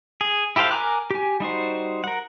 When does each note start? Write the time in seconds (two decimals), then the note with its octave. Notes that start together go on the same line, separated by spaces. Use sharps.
0.21 G#4
0.56 E4 G4 A4 C5 F5
0.71 A#4 G#5 A#5 D6 F#6
1.11 G4 G#5
1.40 G3 D#4 F#4 C5
2.04 A#4 F#5